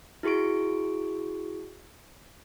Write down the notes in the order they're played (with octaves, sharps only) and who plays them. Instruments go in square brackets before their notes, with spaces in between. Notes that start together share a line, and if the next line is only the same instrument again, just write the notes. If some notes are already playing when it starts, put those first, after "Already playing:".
[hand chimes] E4 F#4 G#4 C#6 D7